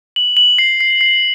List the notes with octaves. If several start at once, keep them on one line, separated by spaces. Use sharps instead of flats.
F#7
F#7
C7
C7
C7